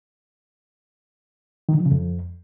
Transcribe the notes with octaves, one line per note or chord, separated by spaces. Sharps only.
D#3
D3
F3
C#3
F2